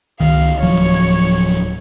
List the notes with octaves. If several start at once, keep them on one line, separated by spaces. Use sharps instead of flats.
C#2 D#3 F5
D1 F3 F#3 C#5